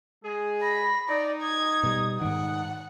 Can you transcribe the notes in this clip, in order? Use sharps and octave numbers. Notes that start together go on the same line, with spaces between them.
G#3 G#4
B5 A#6
D#4 D5
D#6 G#6
B2 G3
G#2 D#3 F#5